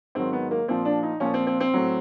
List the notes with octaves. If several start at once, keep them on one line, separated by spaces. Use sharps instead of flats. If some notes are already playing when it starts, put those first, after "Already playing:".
G#2 D#3 F#3 C4
B3
A#3
A#2 F3 C4
D4
D#4
A#2 F3 C#4
C4
C4
C4
A2 F#3